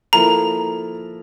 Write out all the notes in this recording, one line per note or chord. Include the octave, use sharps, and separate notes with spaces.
F3 A#3 E4 A4 A#5